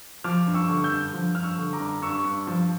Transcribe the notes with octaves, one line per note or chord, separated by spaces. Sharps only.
F3 D6 F6
G2
C#6 E6
D3
E6 G6
G2
F3
G2 F6
C#6 E6
D3
A#5 D6
G2
G2 C#6 E6
G2
F3